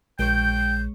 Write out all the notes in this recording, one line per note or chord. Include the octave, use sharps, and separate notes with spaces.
A#1 G#3 C#5 G5 C#6 G6